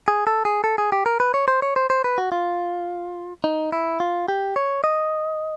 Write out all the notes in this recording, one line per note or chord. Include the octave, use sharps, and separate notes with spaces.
G#4
A4
G#4
A4
G#4
G4
A#4
B4
C#5
C5
C#5
C5
C5
B4
F#4
F4
D#4
E4
F4
G4
C#5
D#5